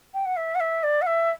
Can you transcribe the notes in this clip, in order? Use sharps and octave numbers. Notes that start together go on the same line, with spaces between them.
G5
F#5
E5
F#5
E5
D5
F#5
E5